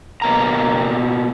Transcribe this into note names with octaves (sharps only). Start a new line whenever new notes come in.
B2 A#3 A#5